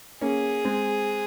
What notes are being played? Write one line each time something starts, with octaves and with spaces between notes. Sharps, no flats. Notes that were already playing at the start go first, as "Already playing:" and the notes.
A#3 C#4 G#4
G#3 C4